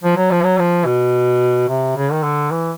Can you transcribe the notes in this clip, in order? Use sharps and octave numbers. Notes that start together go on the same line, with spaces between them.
F3
F#3
F3
F#3
F3
B2
C3
C#3
D#3
D3
E3